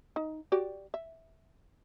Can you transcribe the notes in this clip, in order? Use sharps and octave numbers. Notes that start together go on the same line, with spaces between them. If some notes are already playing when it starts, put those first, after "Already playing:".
D#4
F#4 G4 D5
E5